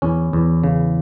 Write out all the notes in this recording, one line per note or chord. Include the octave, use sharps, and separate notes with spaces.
E2 C#4
E2
C#3